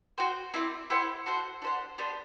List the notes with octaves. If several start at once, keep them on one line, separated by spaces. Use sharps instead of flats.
F#4 C5 G5
C4 E4 A4 D5
E4 G4 C5 F#5
F#4 A4 C5 F#5
D4 G4 C5 F#5
B3 D4 G4 C5